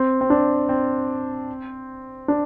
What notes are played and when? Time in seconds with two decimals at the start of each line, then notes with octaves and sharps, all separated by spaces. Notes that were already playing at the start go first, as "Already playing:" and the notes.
Already playing: C4
0.21 C4
0.30 D4
0.69 C4
2.28 D4